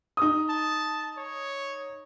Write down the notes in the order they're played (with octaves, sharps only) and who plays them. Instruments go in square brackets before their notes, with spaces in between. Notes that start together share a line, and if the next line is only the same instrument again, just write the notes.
[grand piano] D#4 D#6
[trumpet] A5
C#5